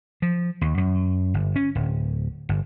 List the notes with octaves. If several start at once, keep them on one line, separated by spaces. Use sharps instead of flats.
F3
D#2
F#2
G1
C#4
D1
G1